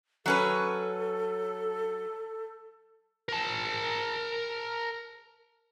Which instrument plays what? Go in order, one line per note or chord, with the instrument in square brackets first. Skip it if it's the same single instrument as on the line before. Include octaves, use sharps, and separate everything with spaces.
[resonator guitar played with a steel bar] F#3 C#4 B4 [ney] A4
[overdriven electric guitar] A#4 A5